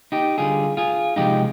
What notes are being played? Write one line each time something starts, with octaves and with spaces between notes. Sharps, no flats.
D#4 G4
D3 G3 F4 G#4
F4 G#4
C3 F3 G#3 D#4 G4